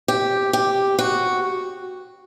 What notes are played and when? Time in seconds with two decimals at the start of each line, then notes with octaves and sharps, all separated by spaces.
0.08 G4
0.53 G4
0.99 F#4